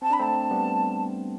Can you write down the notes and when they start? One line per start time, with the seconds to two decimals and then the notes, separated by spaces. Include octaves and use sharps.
0.02 C4 A5
0.10 D4 B5
0.19 A3 C4 A5
0.51 G3 B3